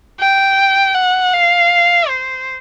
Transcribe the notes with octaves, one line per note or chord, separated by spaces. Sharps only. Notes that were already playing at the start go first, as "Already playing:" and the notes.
G5
F#5
F5
C5